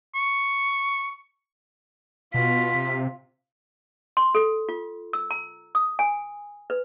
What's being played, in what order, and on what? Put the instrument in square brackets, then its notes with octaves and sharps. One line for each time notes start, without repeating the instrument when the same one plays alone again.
[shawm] C#6
[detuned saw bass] B2 [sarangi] F4 [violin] B6
[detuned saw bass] C3
[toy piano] C6
A4
F4
E6
A#5
D#6
G#5
B4